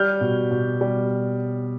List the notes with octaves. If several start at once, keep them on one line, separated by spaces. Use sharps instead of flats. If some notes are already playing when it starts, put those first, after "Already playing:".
Already playing: G3 F6 G6
B2
B2
G3